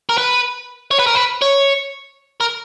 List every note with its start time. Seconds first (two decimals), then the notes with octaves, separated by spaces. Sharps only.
0.09 A#4
0.18 B4
0.91 C#5
0.99 B4
1.07 A#4
1.15 B4
1.42 C#5
2.40 A#4